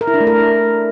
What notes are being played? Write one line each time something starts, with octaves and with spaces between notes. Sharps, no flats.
A#4
E4
D4
A3
A#4